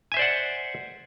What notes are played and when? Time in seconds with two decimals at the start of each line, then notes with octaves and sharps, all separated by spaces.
0.12 G#5
0.14 E5
0.17 C5
0.19 D5
0.22 F#5